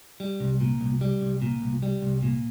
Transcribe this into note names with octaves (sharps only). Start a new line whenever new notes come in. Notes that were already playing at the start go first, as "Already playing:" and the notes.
G3
C2
A#2
C2
G3
C2
A#2
C2
G3
C2
A#2